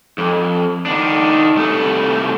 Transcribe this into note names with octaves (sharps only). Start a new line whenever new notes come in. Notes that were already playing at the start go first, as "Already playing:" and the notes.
F2
D#3 D4
C2 A3